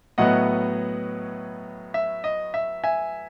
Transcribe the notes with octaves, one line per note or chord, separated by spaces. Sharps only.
A2 F#3 B3 D#5 F#5
E5
D#5
E5
E5 G#5